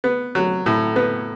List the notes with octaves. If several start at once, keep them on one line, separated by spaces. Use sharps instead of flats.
B3
F#3
A2
B3